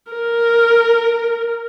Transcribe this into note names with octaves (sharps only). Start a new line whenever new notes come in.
A#4